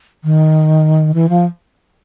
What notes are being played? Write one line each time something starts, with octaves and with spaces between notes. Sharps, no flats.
D#3
E3
F3